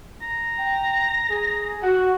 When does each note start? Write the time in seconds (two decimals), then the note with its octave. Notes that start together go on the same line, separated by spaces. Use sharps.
0.22 A#5
0.59 G5
1.30 G#4
1.83 F#4 F#5